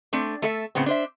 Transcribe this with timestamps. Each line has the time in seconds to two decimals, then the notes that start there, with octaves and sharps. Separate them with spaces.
0.13 A3 C4 D4
0.42 A3 A4 E5
0.75 A2 C#3 B3 C4
0.86 D4 C5 E5